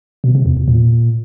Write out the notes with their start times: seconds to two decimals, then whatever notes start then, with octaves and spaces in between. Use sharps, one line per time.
0.24 B2
0.35 C3
0.46 E2
0.57 E2
0.68 A#2